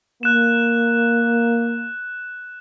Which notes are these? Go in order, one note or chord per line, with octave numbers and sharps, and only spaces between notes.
A#3 F#6 E7